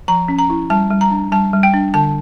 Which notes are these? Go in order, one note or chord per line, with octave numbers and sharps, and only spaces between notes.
F3 A#5
C#4
A#5
E4
G3 A5
G3
A#5
D4
G3 A5
G3
G5
D4
D3 A5